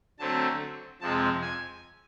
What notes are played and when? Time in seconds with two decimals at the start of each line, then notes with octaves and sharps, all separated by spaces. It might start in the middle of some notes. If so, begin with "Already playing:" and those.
0.19 D3 F#3 A3 C4 A5
1.01 F2 C3 F3 G#3 C4 A5
1.42 G#5